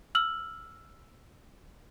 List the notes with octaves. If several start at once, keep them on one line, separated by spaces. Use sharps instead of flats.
E6 F6 F#7